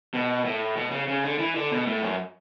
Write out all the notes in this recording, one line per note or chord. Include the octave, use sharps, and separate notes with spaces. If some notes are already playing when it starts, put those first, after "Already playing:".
B2
A2
B2
C#3
C#3
D3
E3
D3
B2
A2
F#2